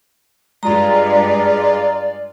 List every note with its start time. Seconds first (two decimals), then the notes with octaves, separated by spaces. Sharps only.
0.63 G2 G#3 F4 D5 A#5